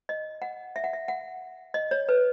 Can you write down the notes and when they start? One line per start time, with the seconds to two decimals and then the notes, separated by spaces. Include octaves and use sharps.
0.09 D#5
0.42 F#5
0.76 E5
0.84 F#5
0.93 E5
1.08 F#5
1.74 D#5
1.91 C#5
2.09 B4